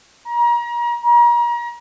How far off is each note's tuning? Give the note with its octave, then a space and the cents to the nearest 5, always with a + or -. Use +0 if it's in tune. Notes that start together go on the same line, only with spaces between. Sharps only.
A#5 +35
A#5 +35